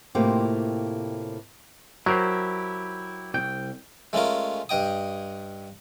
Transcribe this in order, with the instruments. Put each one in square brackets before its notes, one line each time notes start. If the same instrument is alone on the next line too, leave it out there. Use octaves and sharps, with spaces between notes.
[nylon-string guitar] A2 C3 A#3 C4 F4 G4
[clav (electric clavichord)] F#3 A#4 C5 [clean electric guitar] E4 G4
[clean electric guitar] C2 G5
[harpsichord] G#3 A3 C#4 F4 A#4
G2 D#5 G5 D#6